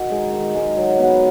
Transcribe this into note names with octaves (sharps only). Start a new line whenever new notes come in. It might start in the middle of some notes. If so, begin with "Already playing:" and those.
Already playing: D#3 F#4
G#3 D#4
D#3
G#3 D#4
F#3
B3 D#4 F#4